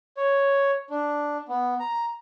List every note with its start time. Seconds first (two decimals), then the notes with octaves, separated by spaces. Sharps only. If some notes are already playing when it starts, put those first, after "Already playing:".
0.17 C#5
0.90 D4
1.48 B3
1.80 A#5